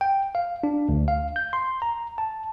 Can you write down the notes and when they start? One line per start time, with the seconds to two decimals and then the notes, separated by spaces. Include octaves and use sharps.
0.01 G5
0.35 F5
0.63 D4
0.89 D2
1.08 F5
1.36 G6
1.53 C6
1.82 A#5
2.18 A5